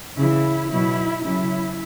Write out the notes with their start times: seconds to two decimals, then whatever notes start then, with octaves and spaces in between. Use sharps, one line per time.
0.17 C#3 E3 E4
0.71 B2 F#3 E4
1.24 C#3 F#3 E4